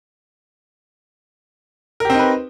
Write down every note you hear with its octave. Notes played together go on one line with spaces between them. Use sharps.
C4 D#4 G4 A#4 B4